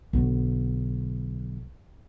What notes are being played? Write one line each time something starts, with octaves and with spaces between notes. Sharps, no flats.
B1 D3